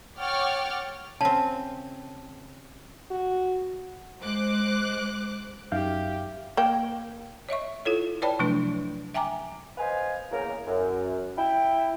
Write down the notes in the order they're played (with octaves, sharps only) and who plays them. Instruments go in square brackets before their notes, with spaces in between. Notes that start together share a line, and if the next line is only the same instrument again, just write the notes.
[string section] C#5 F#5 G5 D6 F6 A6
[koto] C#3 C4 [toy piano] A5
[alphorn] F#4
[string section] G#3 C5 D6 F#6
[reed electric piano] F#2 F5 G6 [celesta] D#4 E5 [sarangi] G4
[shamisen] A#3 G5
[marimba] C#5 D#5 E5 C#6
E4 F4 A4 C#5
B4 C#5 D5 G5 A5 B5
C3 F3 F#3 A3 D4 B4
E5 G5 G#5 A#5 D6
[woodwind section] B4 C5 D#5 F5 G#5
E2 C#3 A#3 A#4
F#2
E4 G5